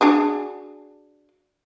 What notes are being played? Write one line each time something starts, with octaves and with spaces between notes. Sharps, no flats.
D4 F#4 G#4